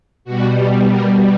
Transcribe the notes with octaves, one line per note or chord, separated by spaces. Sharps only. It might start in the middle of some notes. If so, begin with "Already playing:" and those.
B2 G3 F#4
A#4